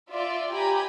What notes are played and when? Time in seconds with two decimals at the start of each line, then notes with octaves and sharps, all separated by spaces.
0.10 F4 D5 E5
0.54 G4 G#5 A#5 B5